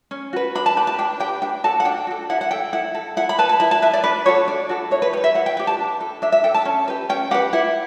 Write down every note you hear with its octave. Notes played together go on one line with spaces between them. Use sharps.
C#4
F#4 B4
D4 B5
A5
G4 B4 B5
A5
D4 G5
G4 B4 G5
D4 G5
F#4 A4 A5
F#5
D4 G5
F#4 A4
E4 F#5
F#5
A4 G5
E4 F#5
A4
E4 F#5
B5
B4 A5
A5
E4 B5
A5
B4 E5
D5
D4 B4
F#4 A4 C#5
D4 D5
F#4 A4
E4 C#5
B4
G4 B4 C#5
E5
E4 F#5
G5
G4 B4 G5
A5
D4
A4
D4 E5
E5
A4 G5
A5
C#4
G4 B4
C#4 G5
G4 B4 F#5
E4 F#5